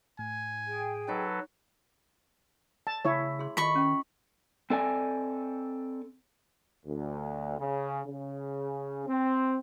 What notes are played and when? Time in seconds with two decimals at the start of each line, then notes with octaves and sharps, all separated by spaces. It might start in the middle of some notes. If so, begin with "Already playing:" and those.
0.19 A2 G#5
0.66 G#4 G5
1.08 F#3 D#4 A4 B4
2.87 A5
3.05 C#3 E4 C#5
3.39 G#4 C6
3.57 D#3 F4 A4 D#5 B5 C#6
3.75 C#4 G5
4.70 C4 A4 D5 G#5
6.86 D2
7.59 C#3
8.07 C#3
9.07 C4